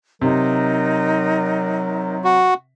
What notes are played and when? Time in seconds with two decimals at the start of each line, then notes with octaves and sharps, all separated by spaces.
0.21 C3 F#3 D#4 A#4
2.24 F#4